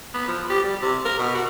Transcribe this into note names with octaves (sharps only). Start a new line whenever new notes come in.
B3
F3
G4
G3
C3
A#4
B2
F#4